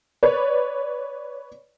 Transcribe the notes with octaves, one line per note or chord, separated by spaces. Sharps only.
B4 C#5 D5